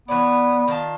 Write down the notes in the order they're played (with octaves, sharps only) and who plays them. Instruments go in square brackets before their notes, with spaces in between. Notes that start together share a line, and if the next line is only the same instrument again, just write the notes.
[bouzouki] E3 C#5 D5 [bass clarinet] B3
[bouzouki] D#3 F4 A5